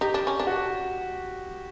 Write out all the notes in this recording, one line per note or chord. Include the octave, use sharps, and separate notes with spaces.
D#4 G4
D4
C#4
D4
F#4